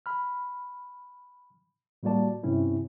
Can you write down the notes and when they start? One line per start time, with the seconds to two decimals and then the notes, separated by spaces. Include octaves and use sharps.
0.06 B5 F6
2.03 A2 G3 A#3 F#4 D5 A5
2.43 G2 C3 C4 C#4 E4